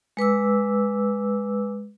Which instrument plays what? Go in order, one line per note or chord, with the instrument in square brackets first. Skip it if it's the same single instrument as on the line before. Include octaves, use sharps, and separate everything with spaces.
[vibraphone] G#3 B4 D6 E6